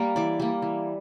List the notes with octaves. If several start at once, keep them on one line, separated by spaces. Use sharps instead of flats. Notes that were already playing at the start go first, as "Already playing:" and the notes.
Already playing: G3 A#3 A#4
E3 D5
G3 A#3
E3